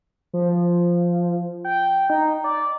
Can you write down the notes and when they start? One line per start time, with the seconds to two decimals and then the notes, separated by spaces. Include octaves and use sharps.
0.33 F3
1.65 G5
2.10 D#4
2.44 D5